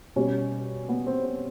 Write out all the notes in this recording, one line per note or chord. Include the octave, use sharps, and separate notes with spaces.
B2 G3 C#4
B3
C4
C4